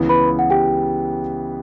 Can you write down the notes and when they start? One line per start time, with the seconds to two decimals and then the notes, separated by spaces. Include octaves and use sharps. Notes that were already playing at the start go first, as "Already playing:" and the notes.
Already playing: C#2 C#3 E3 B3 E4
0.09 B4 B5
0.39 F#5
0.50 G4 G5